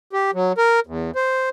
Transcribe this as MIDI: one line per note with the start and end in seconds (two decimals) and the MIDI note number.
0.13 0.31 67
0.34 0.52 54
0.58 0.80 70
0.87 1.11 40
1.15 1.49 72